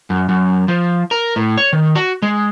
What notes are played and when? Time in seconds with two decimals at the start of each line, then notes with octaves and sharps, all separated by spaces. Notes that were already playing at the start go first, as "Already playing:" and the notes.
0.10 F#2
0.29 F#2
0.68 F3
1.11 A#4
1.36 A2
1.58 C#5
1.73 D#3
1.95 F#4
2.22 G#3